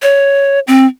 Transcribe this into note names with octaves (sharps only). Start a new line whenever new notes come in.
C#5
C4